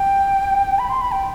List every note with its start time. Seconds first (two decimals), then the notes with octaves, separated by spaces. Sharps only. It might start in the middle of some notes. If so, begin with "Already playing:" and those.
Already playing: G5
0.79 B5
0.90 C6
1.01 B5
1.12 G5